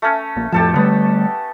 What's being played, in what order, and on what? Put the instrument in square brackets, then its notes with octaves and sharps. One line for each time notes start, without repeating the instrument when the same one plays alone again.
[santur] A3 C#4
[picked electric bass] A#1 A#2
[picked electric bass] F2 A2 F3 [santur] G4 A4 A5
[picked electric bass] D3 G3 A3 [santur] B3